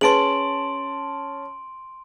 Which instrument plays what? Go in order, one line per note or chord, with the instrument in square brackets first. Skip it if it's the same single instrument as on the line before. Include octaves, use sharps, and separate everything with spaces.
[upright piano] C#4 A5 [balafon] G#4 B4 [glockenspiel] C6 D7 F#7